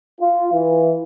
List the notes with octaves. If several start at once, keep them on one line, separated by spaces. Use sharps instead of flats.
F4
E3